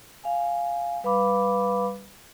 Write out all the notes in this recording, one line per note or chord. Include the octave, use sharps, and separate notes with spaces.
F5 G#5
G3 B4 F5 B5 D6